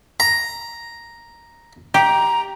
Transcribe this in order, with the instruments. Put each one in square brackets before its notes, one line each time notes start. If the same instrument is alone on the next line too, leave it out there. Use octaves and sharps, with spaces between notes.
[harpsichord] A#5
[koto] G4 [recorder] A#5